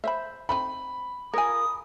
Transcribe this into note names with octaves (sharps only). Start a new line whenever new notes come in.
C5 E5 F5 B5
A3 C4 D#4 B5
F4 A#4 C#5 G#5 D#6